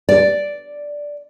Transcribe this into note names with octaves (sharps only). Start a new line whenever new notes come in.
D5